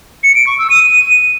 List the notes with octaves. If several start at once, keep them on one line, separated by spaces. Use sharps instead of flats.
C#7
D7
C#6
E6
D#7